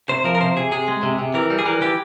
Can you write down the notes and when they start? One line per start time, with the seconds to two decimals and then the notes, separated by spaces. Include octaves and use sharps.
0.09 C3 C5
0.24 F3 A#4
0.35 A#4
0.40 C3 C5
0.56 C3 G#4
0.71 C3 G#4
0.88 G#3
1.03 C3
1.19 C3
1.34 E3 A#4
1.50 G3
1.59 G#4
1.66 E3 A#4
1.81 E3 G4